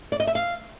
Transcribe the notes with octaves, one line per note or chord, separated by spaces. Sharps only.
D5
D#5
E5
F5